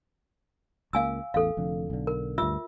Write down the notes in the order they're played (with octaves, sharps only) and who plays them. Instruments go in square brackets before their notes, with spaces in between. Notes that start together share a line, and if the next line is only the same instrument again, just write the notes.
[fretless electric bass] C#2 A#3 [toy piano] F5 G#5 E6
[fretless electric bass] A1 E2 [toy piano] A4 F5
[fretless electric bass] F1 F2 D3
B1 D3
[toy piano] A#4
[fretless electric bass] D2 G2 [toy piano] F4 E5 E6